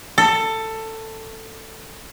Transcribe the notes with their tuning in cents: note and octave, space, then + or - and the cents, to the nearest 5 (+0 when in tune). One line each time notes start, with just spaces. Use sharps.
A4 +15